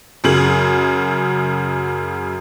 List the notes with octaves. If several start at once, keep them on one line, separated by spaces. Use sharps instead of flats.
F#2 C#3 G#4 F#7